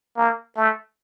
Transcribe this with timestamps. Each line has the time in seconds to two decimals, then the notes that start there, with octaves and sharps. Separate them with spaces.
0.17 A#3
0.57 A3